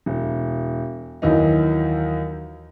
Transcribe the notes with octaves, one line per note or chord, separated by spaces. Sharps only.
E1
D#2 D#3 E3 F#3 D#4